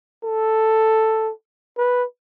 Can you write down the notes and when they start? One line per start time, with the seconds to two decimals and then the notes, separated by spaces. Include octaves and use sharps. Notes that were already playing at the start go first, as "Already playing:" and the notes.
0.24 A4
1.77 B4